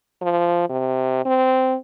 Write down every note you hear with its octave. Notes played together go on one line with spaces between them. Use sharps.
F3
C3
C4